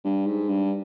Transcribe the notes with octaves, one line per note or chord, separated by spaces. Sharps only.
G2
G#2
G2